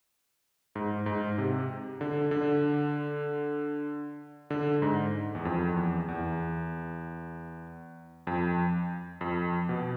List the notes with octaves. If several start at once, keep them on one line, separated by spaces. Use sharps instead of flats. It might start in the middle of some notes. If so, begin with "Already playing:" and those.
G#2
G#2
C3
D3
D3
D3
G#2
E2
F2
E2
E2
F2
F2
B2